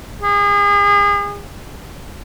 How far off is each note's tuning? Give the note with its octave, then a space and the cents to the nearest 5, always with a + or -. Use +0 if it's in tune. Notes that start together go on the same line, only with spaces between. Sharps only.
G#4 -35